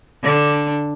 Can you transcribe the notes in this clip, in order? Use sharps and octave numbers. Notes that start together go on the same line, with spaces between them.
D3 D4